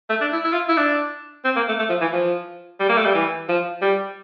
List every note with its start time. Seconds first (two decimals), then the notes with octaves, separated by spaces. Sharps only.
0.09 A3
0.21 D4
0.32 E4
0.44 E4
0.53 F4
0.69 E4
0.77 D4
1.44 C4
1.56 A#3
1.68 A3
1.79 A3
1.89 F3
2.01 E3
2.13 F3
2.80 G3
2.89 A#3
2.97 A3
3.05 G3
3.14 E3
3.48 F3
3.82 G3